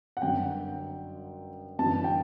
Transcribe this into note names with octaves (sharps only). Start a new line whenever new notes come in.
F#5
G1 F#2 F#3 G5
G1 F#2 E3 A5
G5